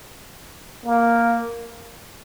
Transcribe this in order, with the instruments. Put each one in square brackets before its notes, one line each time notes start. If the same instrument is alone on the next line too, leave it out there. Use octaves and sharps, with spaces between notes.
[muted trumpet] A#3